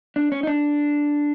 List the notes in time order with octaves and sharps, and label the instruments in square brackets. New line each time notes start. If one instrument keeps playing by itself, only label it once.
[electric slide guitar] D4
C#4
D#4
D4